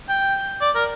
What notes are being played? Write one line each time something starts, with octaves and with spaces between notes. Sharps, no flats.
G5
D5
A#4